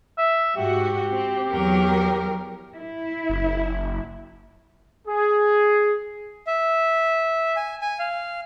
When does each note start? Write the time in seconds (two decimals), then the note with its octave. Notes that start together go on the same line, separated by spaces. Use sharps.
0.18 E5
0.57 G#2 F#4 G4
1.13 C4
1.51 E2 F#3 A#4
2.77 E4
3.30 F#1
5.07 G#4
6.47 E5
7.56 G#5
7.81 G#5
7.99 F5